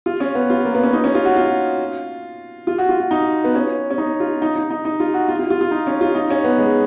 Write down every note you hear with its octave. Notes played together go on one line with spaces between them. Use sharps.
F4
C#4
B3
F4
A#3
B3
C#4
D#4
C#4
F4
F#4
F4
F4
F#4
F4
F4
D#4
B3
C#4
C#4
D#4
F4
D#4
D#4
D#4
D#4
F4
F#4
F4
F4
F4
F4
D#4
C#4
F4
D#4
C#4
B3
G#3